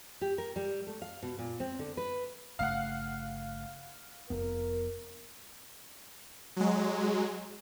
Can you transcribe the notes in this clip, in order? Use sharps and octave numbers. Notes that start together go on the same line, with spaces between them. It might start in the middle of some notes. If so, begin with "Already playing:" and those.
G4
A#4
G3
A3
F5
B2
A#2
C4
D3
B4
G1 C#3 A3 F5 F#5
F1 F2 B3 A#4
F#3 G#3